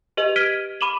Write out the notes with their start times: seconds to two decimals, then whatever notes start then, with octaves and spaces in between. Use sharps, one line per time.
0.17 G4 B4 D#5 F7
0.36 F6 G#6 B6 D7 D#7 G7
0.81 B5 D6 D#7 E7 F#7